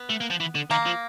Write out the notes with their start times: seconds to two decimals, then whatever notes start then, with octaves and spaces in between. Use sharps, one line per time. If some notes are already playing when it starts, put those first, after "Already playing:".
Already playing: B3
0.10 A3
0.21 A#3
0.30 F3
0.40 E3
0.55 D3
0.70 D#3 A#3
0.86 F3